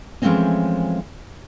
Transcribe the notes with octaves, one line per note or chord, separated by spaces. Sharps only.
E3 F3 G#3 A3 C4 C#4